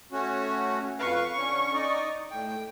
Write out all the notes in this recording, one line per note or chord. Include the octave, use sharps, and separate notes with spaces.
A3 C#4 F#4
F2 B4 F5 C#6
D3 C#4
D#4 D5 D#5
A2 G5